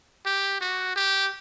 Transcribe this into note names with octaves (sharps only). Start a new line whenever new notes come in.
G4
F#4
G4